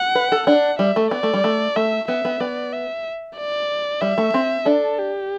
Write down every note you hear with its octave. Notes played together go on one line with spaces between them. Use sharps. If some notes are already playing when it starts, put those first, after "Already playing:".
Already playing: F#5
B4
A4
D4 F#5
G3 E5
A3
B3 D5
A3
G3
A3
A3 E5
B3 E5
B3
B3 D5
E5
D5
G3 E5
A3
C4
D4 A4
G4